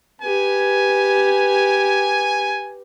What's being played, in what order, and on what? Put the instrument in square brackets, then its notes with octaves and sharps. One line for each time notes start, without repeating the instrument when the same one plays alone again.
[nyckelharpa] G4 B4 [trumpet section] G#5